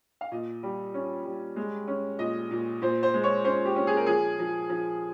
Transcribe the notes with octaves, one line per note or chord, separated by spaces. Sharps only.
F5
A#2 D#5
G3
C#4
G3
G#3
C#4
A#2 D#5
A#2
A#2 C5
C5
G#3
C#5
C#4 C5
G4
C#4
G#4
A#4
F3 G#4
F3
F3